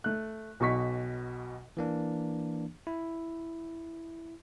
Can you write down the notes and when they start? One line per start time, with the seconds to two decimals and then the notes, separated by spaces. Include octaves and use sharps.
0.04 A3 F#6
0.60 B1 B2 C#6 B6
1.77 E3 A#3 D4
2.87 E4